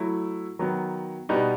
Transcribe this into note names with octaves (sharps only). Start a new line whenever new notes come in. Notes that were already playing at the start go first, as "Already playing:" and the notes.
Already playing: F#3 A3 E4
D#3 F#3 B3
B2 G3 B3 D#4